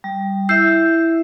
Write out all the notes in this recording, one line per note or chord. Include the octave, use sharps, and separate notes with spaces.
G3
E4 E5 E6 G6 C7